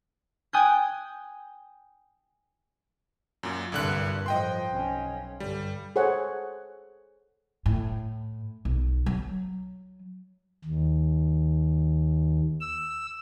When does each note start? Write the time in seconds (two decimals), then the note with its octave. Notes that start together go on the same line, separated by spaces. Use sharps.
0.53 G5 G#5 D#6 F#6 G6
3.43 F#2 A#2
3.72 C2 G2 A#2 D3 F#6
4.26 A2 F3 D#5 G5 C6
4.68 B1 C#4
5.40 G2 D3 G3
5.96 G#4 A4 C5 C#5 F#5
7.66 A2
8.65 B1
9.06 F#3
10.64 D#2
12.60 E6